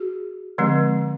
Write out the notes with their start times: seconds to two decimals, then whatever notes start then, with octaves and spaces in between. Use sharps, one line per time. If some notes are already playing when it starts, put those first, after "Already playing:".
Already playing: F#4 G#4
0.58 D3 F3 G#3 C4